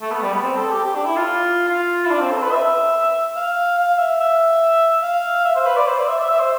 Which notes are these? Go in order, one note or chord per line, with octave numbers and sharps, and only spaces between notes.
A3
B3
G3
B3
C4
A4
G4
G4
D4
E4
F4
F4
E4
D4
C4
A4
C5
B4
E5
F5
F5
E5
E5
F5
E5
C5
B4
D5
C5
D5
E5
E5
E5
C5